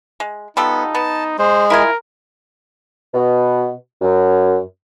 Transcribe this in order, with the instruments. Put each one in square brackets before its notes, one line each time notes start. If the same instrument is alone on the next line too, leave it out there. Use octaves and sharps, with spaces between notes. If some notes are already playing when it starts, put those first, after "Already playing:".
[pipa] G#3
[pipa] G3 F4 A4 [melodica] B3 [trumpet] D#4
[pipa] B3 [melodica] A5
[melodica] G#3 [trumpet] C5
[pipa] E4 F4 G#5 [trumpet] A#4
[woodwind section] B2
F#2